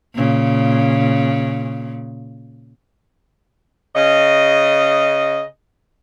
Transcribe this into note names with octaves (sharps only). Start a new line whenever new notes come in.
A#2 C#3
C#3 D#5